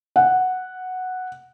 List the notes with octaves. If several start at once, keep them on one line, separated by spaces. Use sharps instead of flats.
F#5